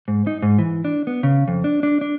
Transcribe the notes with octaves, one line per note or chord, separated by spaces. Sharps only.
G#2
D#4
G#2
E3
D4
B3
C#3
F2
D4
D4
D4